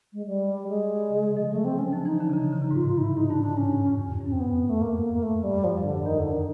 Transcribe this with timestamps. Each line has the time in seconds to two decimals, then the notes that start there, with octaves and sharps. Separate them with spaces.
0.13 G#3
0.27 G3
0.68 G#3
1.10 C#3
1.24 C3
1.37 F3
1.51 F#3 A3
1.65 C4
1.79 F#3 C#4
1.92 F3 D4
2.05 E3 D#4
2.20 D3 D4
2.29 C3
2.33 C#3 D#4
2.53 C#3
2.62 C3
2.71 G#2
2.75 A2 F4
2.89 F4
2.98 D#4
3.03 E4
3.16 G#2 D#4
3.29 G2 D4
3.43 G#2 D4
3.57 G#2 C#4
3.71 G2
3.85 F2
3.99 E2
4.13 F2
4.21 G2
4.26 F#2 C#4
4.32 C4
4.39 E2 B3
4.69 A3
4.81 E2 A#3
4.95 F2
5.09 F2
5.14 A#3
5.22 G2 A3
5.44 G3
5.57 G2
5.64 G#2 F3
5.78 F#2
5.84 D3
5.92 F#2
6.05 E2 D#3
6.19 F2 D3
6.32 D#3